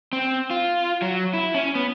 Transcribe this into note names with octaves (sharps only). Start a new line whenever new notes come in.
C4
F4
F#3
E4
C#4
B3